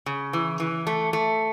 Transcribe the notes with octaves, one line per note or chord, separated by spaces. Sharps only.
C#3
E3
E3
A3
A3